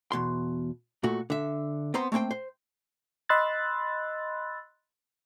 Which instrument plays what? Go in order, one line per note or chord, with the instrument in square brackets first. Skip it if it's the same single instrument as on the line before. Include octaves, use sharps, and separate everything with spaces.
[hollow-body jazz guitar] E2 B2 C6
A#2 A3 F#4
D3 E5
B3 C4 C5 A#5 C6
A3 A#3 C4 C5 G5
C5
[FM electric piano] D#5 B5 C6 E6 F#6 A6